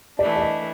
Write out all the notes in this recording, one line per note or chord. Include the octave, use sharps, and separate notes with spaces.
E3 A3 D4 D5
D5
D#5